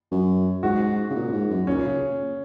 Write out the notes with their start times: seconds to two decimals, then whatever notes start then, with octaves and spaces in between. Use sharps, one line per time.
0.11 F#2
0.63 G#2 F#4
1.10 C#3
1.15 A#2
1.33 G#2
1.50 F#2
1.67 A#2 C#4
1.85 C#3